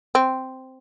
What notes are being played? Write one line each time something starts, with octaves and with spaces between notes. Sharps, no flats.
C4